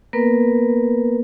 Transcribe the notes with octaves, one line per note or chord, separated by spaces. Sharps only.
A#3 B3 A#4 B4